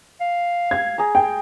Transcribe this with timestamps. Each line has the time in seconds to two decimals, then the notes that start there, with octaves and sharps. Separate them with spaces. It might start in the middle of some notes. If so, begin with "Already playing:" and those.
0.21 F5
0.71 G#6
0.98 G#4 A#5
1.15 G5